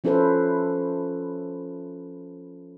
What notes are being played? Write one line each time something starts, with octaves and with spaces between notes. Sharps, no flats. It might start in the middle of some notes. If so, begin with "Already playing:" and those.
F3 C#4 E4 A4 B4 C5